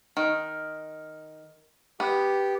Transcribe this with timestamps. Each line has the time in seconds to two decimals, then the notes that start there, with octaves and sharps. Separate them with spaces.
0.17 D#3
2.00 B3 G4